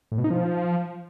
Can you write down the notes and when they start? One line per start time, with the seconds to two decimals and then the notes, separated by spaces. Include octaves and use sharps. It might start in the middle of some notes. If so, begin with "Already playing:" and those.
0.12 A2
0.18 B2
0.24 D#4
0.30 F3